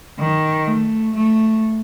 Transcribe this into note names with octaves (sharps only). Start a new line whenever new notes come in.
D#3
A3
A3